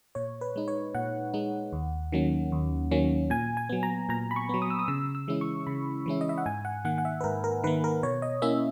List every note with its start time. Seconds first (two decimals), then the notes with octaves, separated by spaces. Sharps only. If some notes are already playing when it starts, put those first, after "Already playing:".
0.15 A#2 C#5
0.41 B4
0.56 G#3 D#4
0.68 C#5
0.95 A#2 F#5
1.34 G#3 D#4
1.73 D#2
2.12 D#3 F#3 A#3 C#4
2.52 D#2
2.91 D#3 F#3 A#3 C#4
3.30 A#2 G#5
3.57 G#5
3.69 F#3 B3
3.83 A#5
4.09 A#2 A#5
4.31 B5
4.36 C#6
4.49 F#3 B3
4.62 D#6
4.70 E6
4.79 D#6
4.88 C#3 E6
5.15 E6
5.28 E3 G#3 C#4 E4
5.41 C#6
5.67 C#3 B5
6.06 E3 G#3 C#4 E4
6.21 D#5
6.29 E5
6.38 F#5
6.46 G#2 G#5
6.65 F#5
6.85 D#3 A#3 F#5
6.98 F#5
7.05 E5
7.21 B4
7.24 G#2 A#4
7.44 A#4
7.64 D#3 A#3 B4
7.84 A#4
8.03 B2 C#5
8.22 D#5
8.42 A#3 C#4 E4 E5